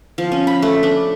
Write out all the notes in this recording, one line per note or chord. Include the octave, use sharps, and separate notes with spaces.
F3
C#4
B5
A3
D4